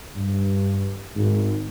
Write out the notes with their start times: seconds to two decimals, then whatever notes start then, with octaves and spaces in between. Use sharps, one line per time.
0.16 G2
1.14 G#1 G#2